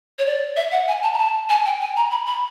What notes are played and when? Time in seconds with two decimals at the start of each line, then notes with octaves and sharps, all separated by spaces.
0.19 C#5
0.26 D5
0.56 E5
0.72 F#5
0.88 G#5
1.03 A5
1.14 A#5
1.18 A5
1.49 G#5
1.66 G5
1.80 G#5
1.97 A#5
2.11 B5
2.26 B5